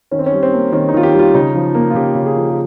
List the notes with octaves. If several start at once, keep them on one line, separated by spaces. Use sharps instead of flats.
D#3 C#4
C4
C#4
G3
C4
A#3
D#3 C#4
D#4
D#3 F4
G4
G3
F4
C#3 D#4
F3
A#3
F4
C#3 G4
C#3
G#4
F3
G#4